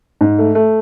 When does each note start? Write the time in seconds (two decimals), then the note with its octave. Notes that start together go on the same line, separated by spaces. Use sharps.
0.21 G#2
0.39 A3
0.55 A3